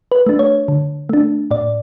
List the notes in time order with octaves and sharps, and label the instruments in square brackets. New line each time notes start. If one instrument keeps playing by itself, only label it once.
[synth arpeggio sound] B4
A3 D4
C#5
D3
A3 D4
A2 D5